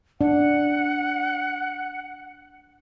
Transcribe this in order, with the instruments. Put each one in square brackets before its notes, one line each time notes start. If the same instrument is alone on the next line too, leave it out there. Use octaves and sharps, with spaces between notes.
[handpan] D4 [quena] F#5